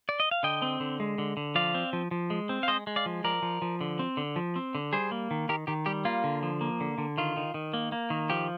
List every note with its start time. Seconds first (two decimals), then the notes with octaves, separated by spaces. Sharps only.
0.09 D5
0.20 D#5
0.31 F5
0.43 D3 D#5 G5
0.62 C4
0.80 D3
1.00 G#3
1.18 D3
1.37 D3
1.55 F3 D5 F5
1.74 C4
1.93 F3
2.11 F3
2.30 G#3
2.49 C4
2.63 F5
2.68 G#3 C5 D#5
2.87 G#3
2.96 D5 F5
3.06 F3
3.24 F3 A#4 D5
3.42 F3
3.62 F3
3.81 D3
3.99 C4
4.17 D3
4.36 F3
4.56 C4
4.75 D3
4.93 G3 G#4 C5
5.11 A#3
5.31 D#3
5.49 D#3 G4 A#4
5.67 D#3 G4
5.86 G3 G4
6.05 A#3 F4
6.24 D3
6.43 F3
6.61 A#3
6.80 D3
6.98 D3
7.18 D#3 F4
7.37 D#3
7.54 D#3
7.74 A#3
7.92 A#3
8.10 D#3
8.30 F3 G4